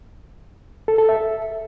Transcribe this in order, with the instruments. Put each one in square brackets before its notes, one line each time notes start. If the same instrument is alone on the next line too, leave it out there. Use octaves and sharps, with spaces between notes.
[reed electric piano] A4
A4
E5